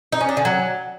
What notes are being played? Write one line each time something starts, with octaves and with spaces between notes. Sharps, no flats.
D#4
C#4
D4
D3
F#3